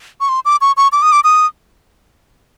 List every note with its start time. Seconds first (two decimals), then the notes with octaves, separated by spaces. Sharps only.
0.21 C#6
0.29 C6
0.45 D6
0.61 C#6
0.77 C#6
0.92 D6
1.02 D#6
1.12 D6
1.24 D#6